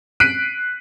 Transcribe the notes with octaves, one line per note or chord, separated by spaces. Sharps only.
F#6 B6 C7 D7 D#7